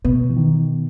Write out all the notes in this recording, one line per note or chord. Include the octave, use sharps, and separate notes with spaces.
B2 B3
E3
D#3